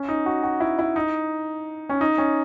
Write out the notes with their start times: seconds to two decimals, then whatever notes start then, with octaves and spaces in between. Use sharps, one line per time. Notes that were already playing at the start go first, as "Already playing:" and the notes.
Already playing: C#4
0.08 D#4
0.26 F#4
0.43 F#4
0.60 E4
0.79 E4
0.96 D#4
1.89 C#4
2.01 D#4
2.18 C#4